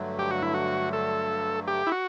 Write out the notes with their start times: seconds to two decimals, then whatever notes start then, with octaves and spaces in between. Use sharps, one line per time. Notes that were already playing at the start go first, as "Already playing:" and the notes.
Already playing: G2 D3 F#3 A3
0.19 G4
0.31 F#4
0.42 E4
0.54 F#4
0.93 A4
1.68 G4
1.87 E4
1.92 F#4